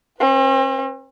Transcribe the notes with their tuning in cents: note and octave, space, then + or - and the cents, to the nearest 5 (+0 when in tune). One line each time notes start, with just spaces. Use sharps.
C4 +45 B4 -5